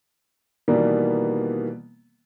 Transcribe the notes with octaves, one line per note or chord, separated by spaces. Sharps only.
B2 D#3 E3 G3 A#3 B3